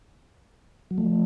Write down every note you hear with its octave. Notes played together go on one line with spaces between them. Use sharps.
F#3
F3 A3